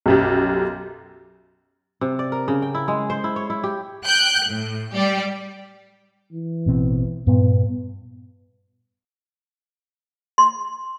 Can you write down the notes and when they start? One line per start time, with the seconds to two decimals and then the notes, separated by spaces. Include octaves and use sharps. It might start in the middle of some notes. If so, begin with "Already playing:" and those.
0.06 B1 F#2 G4
2.01 C3
2.19 D5
2.32 A#4
2.48 C#3
2.62 G5
2.75 E4
2.88 G#3
3.10 C5
3.24 E4
3.36 C#5
3.50 E4
3.64 G4
4.05 G5 F#6 G6
4.48 A2
4.94 G3 G4 D5
6.32 E3
6.66 A1 B2 C4
7.27 G2 A#2 B3
10.38 C6